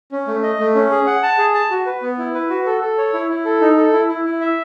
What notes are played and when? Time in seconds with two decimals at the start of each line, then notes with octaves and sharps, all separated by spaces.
0.12 C#4
0.27 A3
0.43 D#5
0.59 A3
0.75 C#4
0.91 G#4
1.07 F#5
1.23 A5
1.39 G#4
1.54 A5
1.71 F#4
1.86 B4
2.02 B3
2.18 E4
2.34 B4
2.50 F#4
2.66 A4
2.81 A4
2.98 C#5
3.14 E4
3.29 E4
3.45 A4
3.61 D#4
3.77 A4
3.93 E4
4.08 E4
4.25 E4
4.41 E5